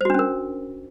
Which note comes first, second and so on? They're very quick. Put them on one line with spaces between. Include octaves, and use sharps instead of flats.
C5 F#4 D4 C#4 A#4